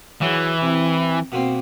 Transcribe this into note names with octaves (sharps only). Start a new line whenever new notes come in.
E3 F#3 G#4
C3
B2 A#3 C4